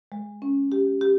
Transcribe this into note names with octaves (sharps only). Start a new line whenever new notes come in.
G#3
C#4
G4
G4